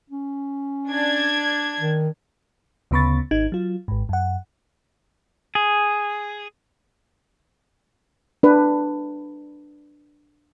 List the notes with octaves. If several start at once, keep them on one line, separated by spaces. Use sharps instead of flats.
C#4
D4 G#6
D#3
D2 C#3 B3 B5 C#6 A6
G#1 D#4 G#6
F#3 F4
G#1 G#2
F#2 F#5
G#4
D4 B4